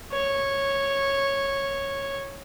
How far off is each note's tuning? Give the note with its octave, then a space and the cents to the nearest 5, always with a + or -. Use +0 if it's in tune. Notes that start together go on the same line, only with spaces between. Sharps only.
C#5 -10